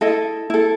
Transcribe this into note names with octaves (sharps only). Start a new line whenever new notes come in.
E4 A4 D#5
E4 A4